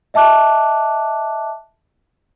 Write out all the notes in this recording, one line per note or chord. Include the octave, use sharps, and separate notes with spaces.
D#5 E5 A5 D6 F#6